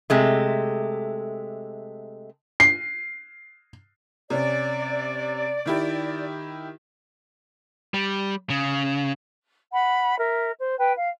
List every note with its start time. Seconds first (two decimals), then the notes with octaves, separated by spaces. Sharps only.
0.10 C3 G#3 A3
2.60 C7
4.30 C3 C#4 D5
5.66 D#3 E4 G4
7.94 G3
8.50 C#3
9.74 F#5 B5
10.19 A#4 E5
10.60 C5
10.79 B4 G5
10.96 F5